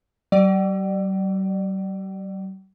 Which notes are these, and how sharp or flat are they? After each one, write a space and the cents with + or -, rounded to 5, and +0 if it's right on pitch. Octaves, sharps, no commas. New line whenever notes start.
G3 -45 D5 +20